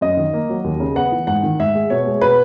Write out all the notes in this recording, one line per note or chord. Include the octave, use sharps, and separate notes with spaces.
F#2 D#5
D#3
A#3
F#3
D#2
C#3
B3 F#5
E3
G#2 F#5
D#3
G#2 E5
G#3
B2 C#5
G#3
B2 B4